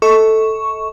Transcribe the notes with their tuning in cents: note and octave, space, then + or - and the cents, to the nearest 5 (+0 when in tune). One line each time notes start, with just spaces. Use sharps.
A4 +0 D#5 +45 C#6 +0